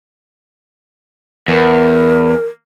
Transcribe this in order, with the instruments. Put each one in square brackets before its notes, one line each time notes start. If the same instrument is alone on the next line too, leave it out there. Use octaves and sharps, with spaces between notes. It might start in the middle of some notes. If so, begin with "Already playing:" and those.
[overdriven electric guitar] E2 [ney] A#4